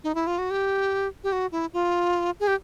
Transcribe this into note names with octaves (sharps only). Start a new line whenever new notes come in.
D#4
E4
F4
F#4
G4
G4
F#4
E4
F4
G#4
G4